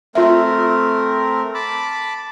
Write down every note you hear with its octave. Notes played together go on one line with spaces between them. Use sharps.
A3 C4 F4 A#4 E5
A5 B5 D6